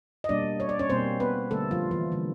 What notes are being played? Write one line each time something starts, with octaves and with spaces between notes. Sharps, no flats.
D#5
B2 G3 A#3 D4 D5
C#5
D5
C#4 C#5
B2 G3 A#3 C4 C5
B3 B4
D3 G3 A3 A#3 A4
F3 F4
E3 E4
D3 G3 A#3